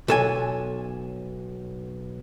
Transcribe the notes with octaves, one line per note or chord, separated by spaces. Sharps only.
B1 A4 G#5